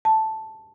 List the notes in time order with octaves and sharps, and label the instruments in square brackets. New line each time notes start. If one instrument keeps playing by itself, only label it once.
[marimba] A5